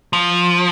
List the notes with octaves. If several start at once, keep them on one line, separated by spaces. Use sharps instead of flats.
F3